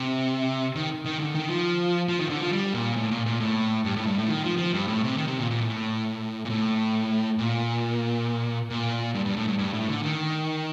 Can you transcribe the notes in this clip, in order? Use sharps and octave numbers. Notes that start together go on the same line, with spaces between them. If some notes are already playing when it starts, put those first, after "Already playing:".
Already playing: C3
D#3
D#3
D3
D#3
F3
F3
D#3
D3
F3
G3
A#2
A2
A#2
A#2
A2
G2
A2
G2
A2
D#3
F3
F3
G2
A2
C3
D#3
C3
A#2
A#2
A2
A#2
A2
A#2
A#2
G2
G2
A2
G2
G2
A2
D3
D#3